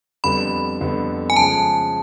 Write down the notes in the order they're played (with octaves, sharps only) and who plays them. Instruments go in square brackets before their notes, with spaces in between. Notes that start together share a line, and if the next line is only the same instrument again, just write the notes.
[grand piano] F2 D3 G3 B3 [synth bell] B5
[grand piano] F2 D3 G3 B3
[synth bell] G#5
[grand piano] C#3 F3 G#3 [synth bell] A5